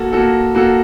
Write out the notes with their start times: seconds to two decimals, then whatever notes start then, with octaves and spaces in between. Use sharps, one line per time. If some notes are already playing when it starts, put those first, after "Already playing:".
Already playing: A#3 F#4 A4
0.13 A#3 F#4 A4
0.55 A#3 F#4 A4